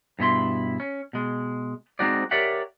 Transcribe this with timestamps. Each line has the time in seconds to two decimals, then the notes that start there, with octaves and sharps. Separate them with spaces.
0.19 G2 B2 E4 C6
0.80 C#4
1.13 B2 G#3
1.99 G#3 C4 D#4 F#4 C5 D5
2.31 G4 A#4 C#5 D5 E5 F#5